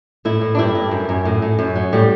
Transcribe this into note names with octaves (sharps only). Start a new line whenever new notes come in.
A2 E4
A2
D4
G2 E4
G2
F#2
F#2
A2
A2
F#2
F#3
A2 G3